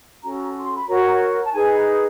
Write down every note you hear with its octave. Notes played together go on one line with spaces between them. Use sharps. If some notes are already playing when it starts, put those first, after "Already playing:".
C#4 F#4 A4 A#5
C6
B5
F#4 A#4 C#5 A#5
A5
D#4 G#4 B4 G#5